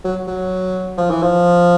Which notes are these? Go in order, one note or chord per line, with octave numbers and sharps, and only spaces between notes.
F#3
F#3
F3
E3
F3